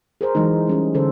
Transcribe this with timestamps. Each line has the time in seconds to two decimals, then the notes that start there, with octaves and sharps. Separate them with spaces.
0.21 G#4 A#4 C5
0.35 E3 F#3 G#3 D#4
0.67 G3 C#4 G#4
0.94 D3 C#4 A4 C5